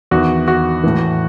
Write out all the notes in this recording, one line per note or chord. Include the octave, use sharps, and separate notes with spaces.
E2 D#3 F#4
F#4
A2 E3